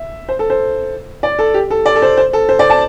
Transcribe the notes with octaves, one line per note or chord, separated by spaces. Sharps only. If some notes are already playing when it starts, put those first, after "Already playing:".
Already playing: E5
C5
A4
C5
D5
A4
G4
A4
D5
A4
C5
C5
A4
C5
D5
A5